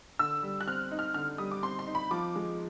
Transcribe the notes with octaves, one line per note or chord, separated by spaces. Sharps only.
D3 E6
G3
F#6
C4 F6
D#4
F6
D3 F6
G3 D#6
D6
C4 C6
C6
D#4
B5
F3 D6
G#3